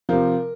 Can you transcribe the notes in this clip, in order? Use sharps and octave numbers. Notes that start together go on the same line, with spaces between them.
C3 F3 A#4